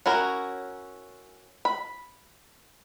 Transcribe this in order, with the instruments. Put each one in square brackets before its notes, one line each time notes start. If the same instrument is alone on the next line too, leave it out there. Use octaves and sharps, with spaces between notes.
[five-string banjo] C#4 E4 F#4 A#4
B5